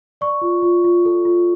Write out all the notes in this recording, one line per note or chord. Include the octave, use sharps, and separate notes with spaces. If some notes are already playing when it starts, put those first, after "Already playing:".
D5 C#6
F4
F4
F4
A4
F4